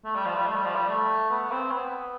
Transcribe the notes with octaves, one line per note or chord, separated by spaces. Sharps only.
A3
G3
F3
G3
A3
G3
F3
G3
A3
B3
C4
B3